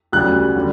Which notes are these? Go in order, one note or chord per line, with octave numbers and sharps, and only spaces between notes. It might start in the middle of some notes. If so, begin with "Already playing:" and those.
D2 C#3 G3 F#6
D3 G3